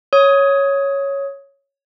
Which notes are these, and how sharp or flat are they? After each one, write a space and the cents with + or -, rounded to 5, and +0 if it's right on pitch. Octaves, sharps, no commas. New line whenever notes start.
C#5 +0 D#6 +15